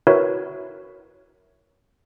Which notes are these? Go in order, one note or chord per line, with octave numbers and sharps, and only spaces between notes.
E4 F#4 A#4 B4 C#5 E5